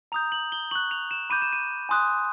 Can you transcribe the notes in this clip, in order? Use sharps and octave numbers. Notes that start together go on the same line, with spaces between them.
A#5 D#6 G6 F7
F#7
G7
C#6 F#6 F#7
F7
E7
B5 D6 G6 D#7
E7
D#7
G#5 C6 D#6 F#6